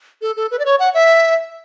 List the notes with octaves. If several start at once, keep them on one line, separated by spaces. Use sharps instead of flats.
A4
A4
B4
D5
C#5
F#5
E5